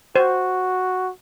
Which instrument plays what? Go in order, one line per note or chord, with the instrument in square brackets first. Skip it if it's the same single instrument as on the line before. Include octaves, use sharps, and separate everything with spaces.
[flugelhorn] F#4 [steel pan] C5